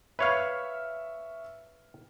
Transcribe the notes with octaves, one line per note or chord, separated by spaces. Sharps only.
B4 C#5 E5 F5 C#6 F6